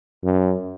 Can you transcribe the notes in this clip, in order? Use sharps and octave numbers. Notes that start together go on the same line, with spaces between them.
F#2